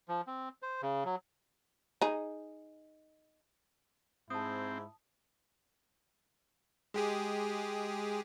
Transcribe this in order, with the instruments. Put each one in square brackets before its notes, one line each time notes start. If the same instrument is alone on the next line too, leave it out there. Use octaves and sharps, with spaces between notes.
[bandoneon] F3
C4
C5
C#3
F#3
[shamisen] D#4 G#4
[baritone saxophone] G#2 [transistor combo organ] C4 [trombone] E4 [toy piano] A5 D#6
[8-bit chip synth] G#3 G4 G#4